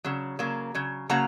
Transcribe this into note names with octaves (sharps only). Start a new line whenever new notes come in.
C#3 F#3
C#3 F#3 A#3
C#3 F#3
C#3 F#3 A#3 F#5 A#5